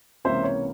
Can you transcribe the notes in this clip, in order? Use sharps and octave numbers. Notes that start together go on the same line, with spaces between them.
C#2 C3 E3 A#3 C#4 C5 E5
C#5